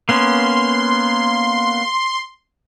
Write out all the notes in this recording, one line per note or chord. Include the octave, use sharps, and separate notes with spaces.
A#3 B3 C#4 C6